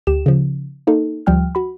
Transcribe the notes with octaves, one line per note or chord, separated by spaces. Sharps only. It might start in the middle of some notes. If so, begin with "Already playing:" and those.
D2 G4 E7
C#3 F3
A#3 D#4 A4
D2 F3 G3 G5 F6
F#4 B5